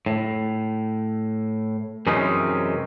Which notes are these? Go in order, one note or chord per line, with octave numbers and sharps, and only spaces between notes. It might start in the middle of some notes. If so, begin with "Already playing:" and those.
A2
F#2 C3 E3 G#3 C#4 D#4